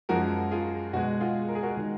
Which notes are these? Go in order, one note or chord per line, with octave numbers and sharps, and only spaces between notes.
F#2 F3 G#3 F#4 A#4
F4 G#4
B2 G#3 F#4
F4 G#4
A#4
G#4
F#4 A#4
D#3 G#3